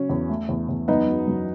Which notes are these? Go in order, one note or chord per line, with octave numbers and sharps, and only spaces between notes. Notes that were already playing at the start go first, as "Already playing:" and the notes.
Already playing: C#3 F#3 C#4
E2
A3
E2
E2
F#2 B3 D#4
F#3
F#2